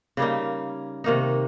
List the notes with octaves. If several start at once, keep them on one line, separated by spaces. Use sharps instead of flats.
C#3 G3 A#3 D#4
C3 D#3 A#3 D#4